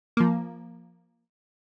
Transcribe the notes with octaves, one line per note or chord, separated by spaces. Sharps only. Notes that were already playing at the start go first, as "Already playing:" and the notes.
F3 A#3